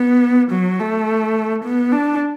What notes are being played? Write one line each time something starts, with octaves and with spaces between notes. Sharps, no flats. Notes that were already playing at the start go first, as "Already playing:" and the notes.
Already playing: B3
F#3
A3
B3
D4